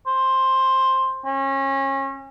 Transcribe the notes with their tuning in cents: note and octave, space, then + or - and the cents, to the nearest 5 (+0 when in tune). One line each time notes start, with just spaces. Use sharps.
C5 +10
C#4 -30